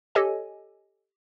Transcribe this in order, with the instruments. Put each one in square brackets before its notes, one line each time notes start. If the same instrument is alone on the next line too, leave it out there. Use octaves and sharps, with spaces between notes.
[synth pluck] G4 A4 C#5 D#5 G#5